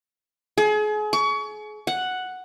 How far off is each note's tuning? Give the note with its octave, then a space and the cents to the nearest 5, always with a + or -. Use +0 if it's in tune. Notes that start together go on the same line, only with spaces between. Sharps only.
G#4 +35
C#6 +30
F#5 +0